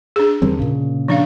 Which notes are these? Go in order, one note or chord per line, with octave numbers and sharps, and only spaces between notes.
D4 G#4
E2 D3 G3 C4
A#2 C#3
F3 D4 F5